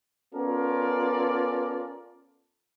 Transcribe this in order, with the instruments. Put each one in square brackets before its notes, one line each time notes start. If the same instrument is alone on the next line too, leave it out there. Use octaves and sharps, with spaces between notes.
[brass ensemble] B3 C#4 F4 A4 A#4 D5